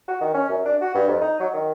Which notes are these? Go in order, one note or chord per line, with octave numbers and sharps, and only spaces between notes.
F#4
D#3
C#4
F#2
D4
F#4
G2
F2
D#4
F#3
D#3